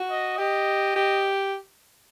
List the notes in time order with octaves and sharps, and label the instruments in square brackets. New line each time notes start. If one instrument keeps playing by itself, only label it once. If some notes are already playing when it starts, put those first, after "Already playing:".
Already playing: [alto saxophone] F#4
[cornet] D#5
[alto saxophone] G4 [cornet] D#5
[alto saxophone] G4